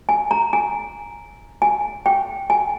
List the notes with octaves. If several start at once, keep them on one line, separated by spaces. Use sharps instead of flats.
G#5
A#5
G#5
G#5
G5
G#5